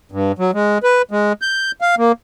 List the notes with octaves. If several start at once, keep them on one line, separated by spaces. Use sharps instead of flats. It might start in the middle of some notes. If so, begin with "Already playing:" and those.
G2
F#3
G#3
B4
G#3
G6
F5
A#3